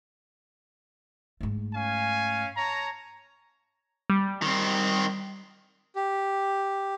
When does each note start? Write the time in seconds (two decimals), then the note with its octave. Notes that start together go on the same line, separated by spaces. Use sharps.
1.41 G#2 A3
1.74 C#4 F5 G#5
2.56 C#5 A5 A#5
4.10 G3
4.42 D#3 C4
5.95 G4